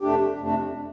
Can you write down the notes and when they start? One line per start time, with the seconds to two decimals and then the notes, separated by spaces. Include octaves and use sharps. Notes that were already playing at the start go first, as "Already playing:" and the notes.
0.01 F2 C3 A3 D4 G4
0.40 F2 C3 A3 D4